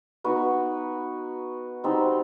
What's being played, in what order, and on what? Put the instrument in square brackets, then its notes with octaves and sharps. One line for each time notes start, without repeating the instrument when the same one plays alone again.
[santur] B3 D#4 F#4 B4
G3 C4 D#4 F#4